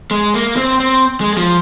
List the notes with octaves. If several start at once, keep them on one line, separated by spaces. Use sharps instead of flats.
G#3
A#3
C4
C4
G#3
G#3
F3